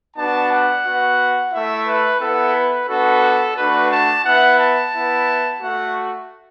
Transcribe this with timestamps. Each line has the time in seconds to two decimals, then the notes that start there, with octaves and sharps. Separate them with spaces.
0.17 B3 D4 F#4 A5
0.52 F#5
0.86 B3 F#4
1.53 A3 E4 E5
1.87 B4
2.21 B3 E4 A4
2.56 B4
2.89 B3 D4 F#4 A4
3.57 A3 D4 F#4 B4
3.91 A5
4.25 B3 E4 F#5
4.60 A5
4.94 B3 E4
5.60 A3 F#4 F#5